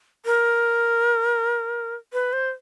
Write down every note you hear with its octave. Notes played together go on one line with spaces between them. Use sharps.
A#4
B4
C5